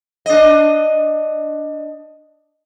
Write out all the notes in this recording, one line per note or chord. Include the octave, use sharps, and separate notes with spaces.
D4 D#5